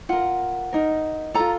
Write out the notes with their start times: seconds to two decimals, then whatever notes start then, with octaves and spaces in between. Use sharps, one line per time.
0.09 F4 A#4 F#5
0.73 D#4 A#4
1.34 F4 A4 A#5